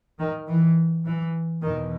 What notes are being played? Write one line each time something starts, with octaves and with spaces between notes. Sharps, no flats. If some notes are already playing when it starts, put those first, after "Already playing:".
D#3
E3
E3
E2 B2 D#3